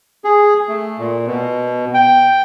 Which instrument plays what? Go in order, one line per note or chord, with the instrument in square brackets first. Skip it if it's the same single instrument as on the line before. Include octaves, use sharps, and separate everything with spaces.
[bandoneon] G#4
A3
A#2
B2
G5